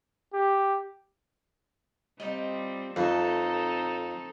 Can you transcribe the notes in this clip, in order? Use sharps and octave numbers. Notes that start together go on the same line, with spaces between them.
G4
G3 C4 D#4 F4 D#5
F2 C4 D#4 A4 B4 E5